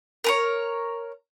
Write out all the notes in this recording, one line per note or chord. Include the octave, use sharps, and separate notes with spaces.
A#4 B4 C#5